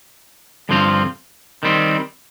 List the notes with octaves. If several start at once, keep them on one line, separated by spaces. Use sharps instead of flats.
G2 D3 F3 C4 F4
D#3 G3 C4